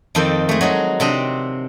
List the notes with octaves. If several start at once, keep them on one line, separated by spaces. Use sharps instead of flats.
F2 D#3 C4 A4 G5
G#3 A3
F#3 G#3 D#4
C3 C4 D4 D#5